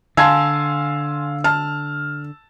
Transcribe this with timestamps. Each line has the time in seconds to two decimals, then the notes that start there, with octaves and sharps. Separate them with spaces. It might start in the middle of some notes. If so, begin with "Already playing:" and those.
0.17 D3 F5 G#5 A5 C6 E6 G#6
1.44 A5 F6